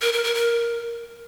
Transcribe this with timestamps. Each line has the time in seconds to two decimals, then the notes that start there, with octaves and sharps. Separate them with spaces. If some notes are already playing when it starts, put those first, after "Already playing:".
0.02 A#4
0.13 A#4
0.24 A#4
0.35 A#4